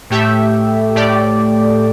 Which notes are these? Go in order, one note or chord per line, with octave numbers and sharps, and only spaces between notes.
A2 A3 G4 E5
A2 A3 G4 D5